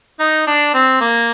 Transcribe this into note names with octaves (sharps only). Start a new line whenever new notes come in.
D#4
D4
C4
A#3